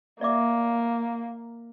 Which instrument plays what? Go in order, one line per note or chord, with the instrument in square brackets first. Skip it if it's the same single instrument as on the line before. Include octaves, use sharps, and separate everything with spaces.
[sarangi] A#3 [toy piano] D5 E5 D6